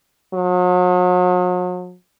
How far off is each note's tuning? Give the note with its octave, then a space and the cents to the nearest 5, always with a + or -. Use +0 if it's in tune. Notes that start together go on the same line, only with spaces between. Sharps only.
F#3 -45